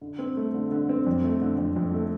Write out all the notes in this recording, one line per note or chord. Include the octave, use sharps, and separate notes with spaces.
D3
C4
A3
D3
D3
C4
F2
A3
D3
F2
F2
A3